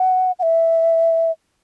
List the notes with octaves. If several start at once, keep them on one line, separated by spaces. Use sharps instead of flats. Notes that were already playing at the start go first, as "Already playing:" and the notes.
Already playing: F#5
F#5
E5